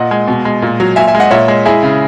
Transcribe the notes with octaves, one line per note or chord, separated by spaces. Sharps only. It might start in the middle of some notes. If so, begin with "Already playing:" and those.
Already playing: A#2 D#5 F#5
G#3
B2
G#3
A#2
F#3
A#2 E5 G#5
E5 G#5
G#3
D#5 F#5
A#2 C#5 E5
G#3
G#3 E4 G#4
C#3